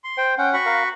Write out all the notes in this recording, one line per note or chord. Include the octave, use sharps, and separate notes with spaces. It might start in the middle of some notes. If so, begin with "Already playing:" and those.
C6
C5 G5
C#4 F#5 G5
F#4 B5 C#6
A#4 F5